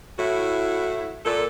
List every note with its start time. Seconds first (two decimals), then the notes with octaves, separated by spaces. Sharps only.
0.19 A2 E4 F#4
1.26 A#2 A4